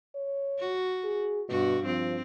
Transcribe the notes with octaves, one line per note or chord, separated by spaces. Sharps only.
C#5
F#4
G#4
G2 B2 F#4
F3 C4